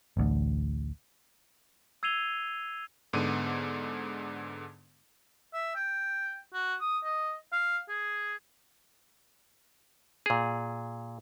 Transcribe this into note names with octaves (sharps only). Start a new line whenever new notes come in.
A1 D2
E6 G#6 C7 D#7 F7 G7
G#2 D3 B3 D#7
E5
G5
F#4
D#6
D#5
F5
G#4
A#2 G#4